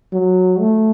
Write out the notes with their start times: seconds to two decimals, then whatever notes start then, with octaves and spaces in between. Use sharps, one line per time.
0.13 F#3
0.60 A3